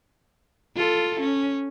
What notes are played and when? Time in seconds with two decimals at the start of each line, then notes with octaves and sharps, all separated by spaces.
0.76 F4 A4
1.20 C#4